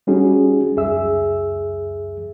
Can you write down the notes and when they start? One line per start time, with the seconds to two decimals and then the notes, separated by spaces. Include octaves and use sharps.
0.07 G3 C#4 D#4 F#4 G#4
0.76 C#2 F#2 G#4 E5 E6